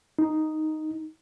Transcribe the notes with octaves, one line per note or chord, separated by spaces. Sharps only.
D#4